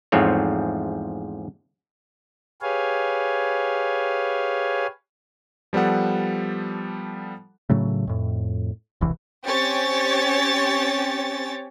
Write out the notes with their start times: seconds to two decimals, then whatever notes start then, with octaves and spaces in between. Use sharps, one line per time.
0.12 E2 G#2 F3 A3 C4 C#5
2.62 G4 G#4 B4 C#5 F5 G#5
5.73 F3 G3 B3 A4 F#5
7.70 A2 C#3 F#3 A3
8.07 F2 A2
9.01 E1 C2 E3
9.46 C4 C#4 G4 C#5 A6